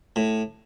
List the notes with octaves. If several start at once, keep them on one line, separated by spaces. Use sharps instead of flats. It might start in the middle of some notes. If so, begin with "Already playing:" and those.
A2